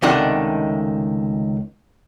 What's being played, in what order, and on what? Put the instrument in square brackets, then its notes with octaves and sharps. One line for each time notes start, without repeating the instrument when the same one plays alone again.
[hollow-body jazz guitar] C#2 C3 D#3 A3 D4 F#5